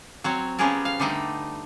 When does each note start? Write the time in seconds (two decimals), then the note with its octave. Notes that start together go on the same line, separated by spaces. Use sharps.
0.24 F#3 C4 C#5
0.59 F3 B3 C#4 G4 G#4 A#4
0.85 F5
1.00 D3 G3 A3 D#4 G5